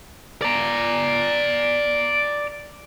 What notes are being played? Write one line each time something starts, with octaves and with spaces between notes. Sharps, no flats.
D5 A#5